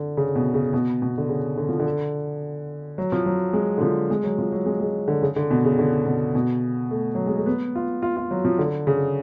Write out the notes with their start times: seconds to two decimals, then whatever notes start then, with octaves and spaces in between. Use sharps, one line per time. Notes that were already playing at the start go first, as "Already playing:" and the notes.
Already playing: D3
0.17 C#3
0.35 B2
0.54 C#3
0.73 B2
1.02 B2
1.18 D3
1.29 C#3
1.57 D3
1.69 F3
1.80 D3
2.98 F#3
3.12 F3
3.26 F#3
3.53 G#3
3.78 D3
3.81 F3
4.10 G#3
4.24 F#3
4.38 F3
4.52 F#3
4.66 G#3
4.80 G#3
5.08 D3
5.22 C#3
5.36 D3
5.51 B2
5.65 C#3
5.79 D3
6.06 B2
6.35 B2
6.91 A3
7.15 F#3
7.26 G#3
7.37 A3
7.46 B3
7.75 F4
8.02 F4
8.17 F4
8.31 F#3
8.45 F3
8.58 D3
8.87 C#3